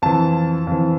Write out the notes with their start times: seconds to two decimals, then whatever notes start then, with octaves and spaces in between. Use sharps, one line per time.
0.02 F2 E3 A5
0.67 F2 E3